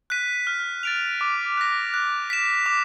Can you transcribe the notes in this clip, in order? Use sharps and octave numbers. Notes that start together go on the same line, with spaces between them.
F#6 B6 D#7
F6
A6 D7 F7
D6
F#6 A#6
F#6
B6 E7
D6